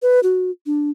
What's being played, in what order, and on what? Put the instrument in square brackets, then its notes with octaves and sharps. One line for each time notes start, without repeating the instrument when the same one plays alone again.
[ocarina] B4
F#4
D4